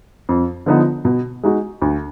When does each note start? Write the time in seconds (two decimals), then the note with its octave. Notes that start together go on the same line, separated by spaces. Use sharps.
0.29 F2
0.66 D3 F3 B3 D#4
1.05 B2
1.43 G#3 D#4 F#4
1.82 D2